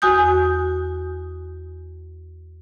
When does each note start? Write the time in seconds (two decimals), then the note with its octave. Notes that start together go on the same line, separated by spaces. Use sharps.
0.02 E2 F#4 G#5 D#6 G6